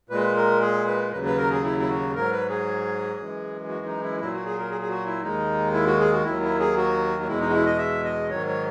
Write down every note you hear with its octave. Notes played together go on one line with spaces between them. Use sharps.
A#2 G#3 B4
A#4
G#4
B4
D#2 C#3 F#3 B4
B4
A#4
G#4
E4
E4
F#4
G#2 F#3 A#4
B4
G#4
F#2 E3 G#3
F#4
D#4
E4
A#2 F#3 E4
F#4
G#4
A#4
G#4
G#4
F#4
E4
D#2 D#3 G#3 D#4
E4
F#4
G#4
F#4
D#2 D#3 F#3 E4
E4
G#4
F#4
F#4
E2 B2 G#3 E4
D#4
F#4
E4
D#5
E5
D#5
G#2 D#3 F#3 C#5
C#5